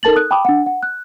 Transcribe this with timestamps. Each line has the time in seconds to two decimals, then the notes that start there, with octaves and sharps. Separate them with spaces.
0.03 D#4 A4 A#4 A5 A6 F#7
0.16 D#6 F#6
0.31 G5 A5 B5 D6 D#6
0.45 D4 F#5
0.66 F#5
0.83 F#6